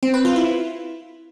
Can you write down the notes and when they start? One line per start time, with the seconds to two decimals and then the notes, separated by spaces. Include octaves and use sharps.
0.03 C4
0.14 B4
0.25 F4
0.36 E4